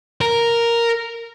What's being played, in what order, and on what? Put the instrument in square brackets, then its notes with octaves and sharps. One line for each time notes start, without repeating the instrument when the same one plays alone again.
[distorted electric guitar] A#4